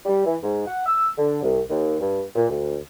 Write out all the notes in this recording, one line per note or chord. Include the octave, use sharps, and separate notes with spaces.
G3
E3
G#2
F#5
E6
D3
C2
D#2
G2
A#2
D2